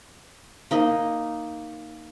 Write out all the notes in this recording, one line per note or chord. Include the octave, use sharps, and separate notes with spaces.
A#3 D#4 D#5